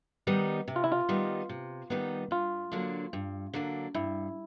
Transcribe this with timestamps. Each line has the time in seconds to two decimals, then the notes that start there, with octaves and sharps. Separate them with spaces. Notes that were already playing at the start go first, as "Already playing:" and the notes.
0.27 D#3 G3 B3 D#4
0.68 C3
0.76 F4
0.84 E4
0.92 F4
1.09 D#3 G3 B3 D#4
1.49 C3
1.90 D#3 G3 B3 D#4
2.31 G2 F4
2.72 D3 F#3 A#3 D4
3.13 G2
3.53 D3 F#3 A#3 D4
3.94 G2 E4